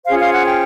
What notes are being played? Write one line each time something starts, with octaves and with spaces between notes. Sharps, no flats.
C#4 F4 G#4 C5 F5
F5
F#5
G5